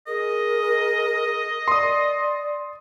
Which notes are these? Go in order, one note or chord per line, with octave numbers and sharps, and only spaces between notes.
G#4 A#4 D#5
D5 C6 D#6